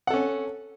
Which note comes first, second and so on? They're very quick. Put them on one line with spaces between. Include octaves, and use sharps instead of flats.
F#5 A4 C#4